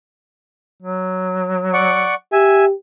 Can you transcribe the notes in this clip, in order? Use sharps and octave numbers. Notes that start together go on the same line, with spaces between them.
F#3
D5 F#5 C#6
G4 E5 G#5